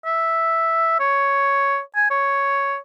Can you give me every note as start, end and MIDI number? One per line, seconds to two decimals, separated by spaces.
0.06 0.97 76
1.00 1.79 73
1.96 2.05 80
2.10 2.77 73